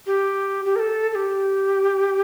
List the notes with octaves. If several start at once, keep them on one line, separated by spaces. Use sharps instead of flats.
G4
G4
A#4
A4
A4
G4